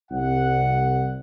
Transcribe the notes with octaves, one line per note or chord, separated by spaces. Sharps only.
C2 F#5